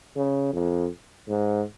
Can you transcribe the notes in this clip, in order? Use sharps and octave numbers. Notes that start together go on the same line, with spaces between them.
C#3
F2
G#2